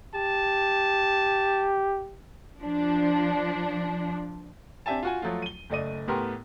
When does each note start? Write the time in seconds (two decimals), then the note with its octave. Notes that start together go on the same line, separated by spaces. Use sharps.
0.15 G4 A5
2.62 F3 D4
4.86 C4 D4 G4 E5 G#5 A5
5.03 F4 F#4 G#5
5.22 F3 F#3 A3 F4
5.42 D#7 G7
5.70 F#1 A3 D5 D#5 D#7
6.08 A2 B3 G4 A#4 C6